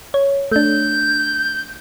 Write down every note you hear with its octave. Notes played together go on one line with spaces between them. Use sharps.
C#5
A3 D4 G6